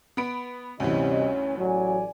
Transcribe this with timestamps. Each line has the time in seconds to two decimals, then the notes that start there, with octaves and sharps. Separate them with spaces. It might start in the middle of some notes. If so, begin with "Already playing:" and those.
0.17 B3 B5 D7
0.80 D2 G2 C3 E3 G3 C#4 D#5
1.58 A1 F#3 D5 G#5